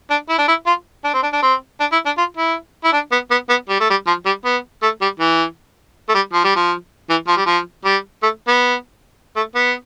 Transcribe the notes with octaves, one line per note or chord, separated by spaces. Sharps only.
D4
E4
D4
E4
F4
D4
C4
D4
D4
C4
D4
E4
D4
F4
E4
E4
D4
B3
B3
B3
G3
A3
G3
F3
G3
B3
A3
G3
E3
A3
G3
F3
G3
F3
E3
F3
G3
F3
G3
A3
B3
A3
B3